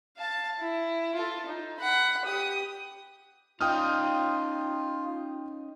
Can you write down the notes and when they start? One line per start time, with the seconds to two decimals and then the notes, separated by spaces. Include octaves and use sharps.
0.17 F5 A5
0.59 E4
1.15 F4 A4
1.46 D#4
1.80 F#5 B5
2.25 G4 D#6
3.61 C#4 D#4 F4 G5 D#6 F6